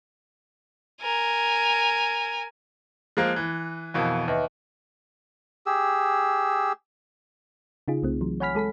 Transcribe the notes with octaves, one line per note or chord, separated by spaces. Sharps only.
A#4 G#5
F3 G#3 A#3 F#6
E3
F2 B2 E3 A#4 F5
D#2 B4 D#5 E5
G4 G#4 E6
C#3 D#4 F4 G#4
C2 A3 C4
E3 F#3
C#5 F#5 G#5 B5 F6 B6
G#3 A4 B5 B6